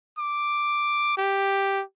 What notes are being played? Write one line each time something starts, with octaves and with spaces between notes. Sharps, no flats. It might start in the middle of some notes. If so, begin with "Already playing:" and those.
D6
G4